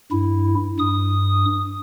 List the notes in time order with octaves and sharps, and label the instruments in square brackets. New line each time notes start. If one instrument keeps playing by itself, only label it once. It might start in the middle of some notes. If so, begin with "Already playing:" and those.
[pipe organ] G2 E4
G2 D#6